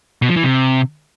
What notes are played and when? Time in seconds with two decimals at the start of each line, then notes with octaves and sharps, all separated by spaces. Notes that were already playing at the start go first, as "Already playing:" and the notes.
0.22 B2
0.29 F3
0.36 E3
0.43 C3